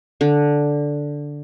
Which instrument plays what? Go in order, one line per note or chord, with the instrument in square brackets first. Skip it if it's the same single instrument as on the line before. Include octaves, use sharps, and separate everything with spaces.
[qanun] D3